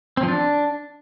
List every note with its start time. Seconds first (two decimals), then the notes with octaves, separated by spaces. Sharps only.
0.17 C4
0.23 F3
0.28 D4